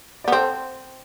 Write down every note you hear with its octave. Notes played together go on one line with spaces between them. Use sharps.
D5
B3
C4 A4 C5